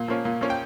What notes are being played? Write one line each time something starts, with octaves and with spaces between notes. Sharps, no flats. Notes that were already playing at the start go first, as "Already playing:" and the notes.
Already playing: A#2
F3 A#3 C#4
A#2
F3 A#3 C#4
G5